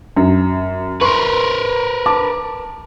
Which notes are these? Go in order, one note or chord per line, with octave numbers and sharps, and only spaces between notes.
F#2
A#4 B4 C6 C#6
A5 D6